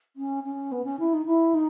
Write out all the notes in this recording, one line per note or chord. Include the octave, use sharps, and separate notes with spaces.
C#4
C#4
B3
C#4
E4
D#4
E4
D#4